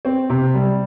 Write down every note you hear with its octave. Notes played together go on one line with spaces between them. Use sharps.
C4
C3
G3